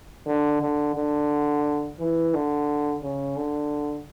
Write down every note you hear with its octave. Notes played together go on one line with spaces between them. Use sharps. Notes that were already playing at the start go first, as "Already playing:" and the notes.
D3
D3
D3
E3
D3
C#3
D3